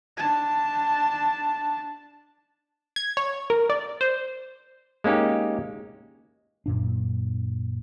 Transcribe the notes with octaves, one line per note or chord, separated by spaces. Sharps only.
D4 A5
G#6
C#5
A#4
D5
C5
G#3 A#3 C#4 D#4 G4
F#2 A#2 D4